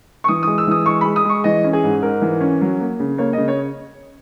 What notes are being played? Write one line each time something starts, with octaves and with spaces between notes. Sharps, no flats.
C#6
E3 D#6
G#3 D#6
E6
E3 D#6
G#3 C#6
G#3 B5
D#6
G#3 C#6
E3 D#5
C#4
G#4
G#2
G#2 A#4
E3
C#4
F#3
A#3
C#3
A#3 C#5
C#3 D#5
C#5